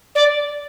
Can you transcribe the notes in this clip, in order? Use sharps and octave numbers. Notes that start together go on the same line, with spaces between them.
D5